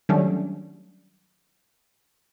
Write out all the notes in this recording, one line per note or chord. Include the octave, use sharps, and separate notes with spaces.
D#3 F#3 G3 A3 C#4 D4